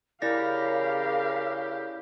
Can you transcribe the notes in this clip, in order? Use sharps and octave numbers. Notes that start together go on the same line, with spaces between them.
C#3 E4 G4 A#4 D5 F5 A#6